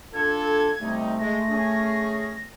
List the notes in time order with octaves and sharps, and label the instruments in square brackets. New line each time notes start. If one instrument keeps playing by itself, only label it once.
[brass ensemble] D4 F4 A4 [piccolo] G#6
[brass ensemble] C3 G3 D#4 [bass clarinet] A3
[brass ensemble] G#3 [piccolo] A#6
[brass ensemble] C#4 G#4